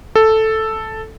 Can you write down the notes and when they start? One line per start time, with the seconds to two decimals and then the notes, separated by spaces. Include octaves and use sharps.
0.16 A4